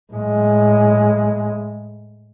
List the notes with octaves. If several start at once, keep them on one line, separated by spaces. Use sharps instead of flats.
A2 G#3